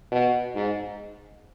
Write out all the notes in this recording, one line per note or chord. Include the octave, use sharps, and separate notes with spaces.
B2
G#2